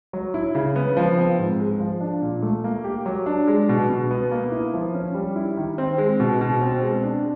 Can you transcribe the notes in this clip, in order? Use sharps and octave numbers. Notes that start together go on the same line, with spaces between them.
F#3
E4
C#3
B3
F3
C4
G#2
G#3
F3
D4
A#2
A3
A#3
G4
F#3
D4
G#3
B2
B2
B3
A#3
E4
F3
C#4
G3
E4
D#3
C4
G#3
B2
B2
C4
G#3
D4